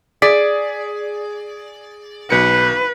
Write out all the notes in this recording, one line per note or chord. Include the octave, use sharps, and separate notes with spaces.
G#4 D5 B6
B1 B4 C#7